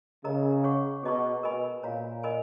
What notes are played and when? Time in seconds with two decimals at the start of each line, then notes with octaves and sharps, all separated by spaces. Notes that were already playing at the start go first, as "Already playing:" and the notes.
0.23 C#3 A#4 D#5 A#5
0.64 G#4 C#5 F#5 C#6
1.03 B2 G#4 D#5 A#5 C#6
1.43 B2 A#4 D#5 G#5 B5
1.83 A#2 F#4 C#5 F5 A#5
2.23 A#4 D#5 G#5 B5